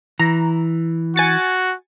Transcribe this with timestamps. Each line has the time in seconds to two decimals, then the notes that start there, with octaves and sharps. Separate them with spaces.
0.20 E3 A#5
1.16 F#4 G#5 A6 C#7